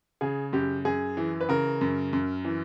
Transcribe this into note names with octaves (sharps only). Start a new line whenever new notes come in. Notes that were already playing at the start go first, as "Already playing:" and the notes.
C#3 G#4
F#2 G4
F#2 G#4
E3
B4
C#3 A#4
F#2
F#2
E3